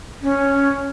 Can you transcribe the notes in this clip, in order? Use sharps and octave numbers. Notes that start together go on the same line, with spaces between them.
C#4